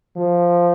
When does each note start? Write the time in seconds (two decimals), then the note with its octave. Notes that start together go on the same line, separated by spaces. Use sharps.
0.17 F3